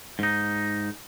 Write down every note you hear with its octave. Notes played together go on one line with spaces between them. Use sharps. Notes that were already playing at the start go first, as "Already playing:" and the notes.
G#2 D#4